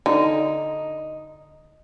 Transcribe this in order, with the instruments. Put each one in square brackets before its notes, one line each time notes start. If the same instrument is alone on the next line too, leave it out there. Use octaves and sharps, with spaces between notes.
[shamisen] D3 [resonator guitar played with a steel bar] D#4